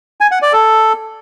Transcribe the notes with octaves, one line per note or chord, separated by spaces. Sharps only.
G#5
F#5
D5
A4